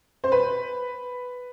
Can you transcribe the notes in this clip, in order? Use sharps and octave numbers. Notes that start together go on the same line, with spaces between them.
C5
B4